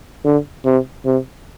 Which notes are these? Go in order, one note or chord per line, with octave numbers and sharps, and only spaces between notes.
D3
C3
C3